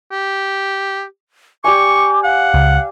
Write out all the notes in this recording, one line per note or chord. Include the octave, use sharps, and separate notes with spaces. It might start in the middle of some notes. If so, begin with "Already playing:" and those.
G4
G4 D5 G#5 C#6 D6
F5 F#5
C#2